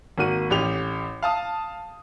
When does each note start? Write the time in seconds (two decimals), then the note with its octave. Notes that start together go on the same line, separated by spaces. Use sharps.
0.18 G#1 A#3 F#4 D#7
0.50 A1 G4 F7
1.23 F5 A5 D#6